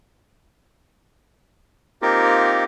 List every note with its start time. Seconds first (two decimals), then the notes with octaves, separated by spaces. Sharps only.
2.02 A#3 C4 D#4 F4 G4 A#4